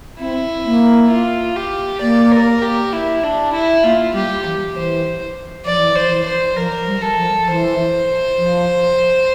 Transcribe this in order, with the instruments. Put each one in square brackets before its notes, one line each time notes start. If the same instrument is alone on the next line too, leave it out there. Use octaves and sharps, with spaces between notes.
[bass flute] C4 [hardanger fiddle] E4
[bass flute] A#3
[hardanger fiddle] F4
G4
[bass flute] A#3 [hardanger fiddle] D5
[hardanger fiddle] A#4
G4
E4
D4
E4
[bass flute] A#3 [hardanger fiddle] F4
[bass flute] G3 [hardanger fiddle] G4
[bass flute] E3
[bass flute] E3 [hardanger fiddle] C5
[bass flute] F3 [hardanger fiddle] D5
[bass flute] E3
[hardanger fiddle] C5
[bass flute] E3
[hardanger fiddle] C5
[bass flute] F3 [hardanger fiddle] A#4
[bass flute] G3
[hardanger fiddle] A4
[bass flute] F3
[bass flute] E3 [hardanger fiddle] C5
[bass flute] F3